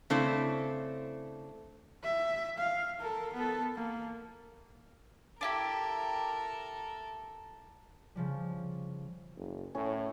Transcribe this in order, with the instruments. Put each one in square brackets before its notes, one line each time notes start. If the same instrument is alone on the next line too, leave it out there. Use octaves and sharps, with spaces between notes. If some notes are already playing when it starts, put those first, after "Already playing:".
[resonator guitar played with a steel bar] C#3 A3 C4 D4 E4
[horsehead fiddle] E5
F5
A4 A#4
B3 A4
A#3
[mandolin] D4 E4 G4 [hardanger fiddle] A4 A#4
[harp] C#3 F3 G3
[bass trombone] F#1
[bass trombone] A2 [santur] C#4